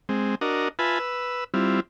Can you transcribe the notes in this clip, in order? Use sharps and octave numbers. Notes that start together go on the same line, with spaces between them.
G#3 C4
D4 F#4 A#4 D#5
F4 B4 E5 G#5 A5 B5
B4 E6
G3 C4 E4 F4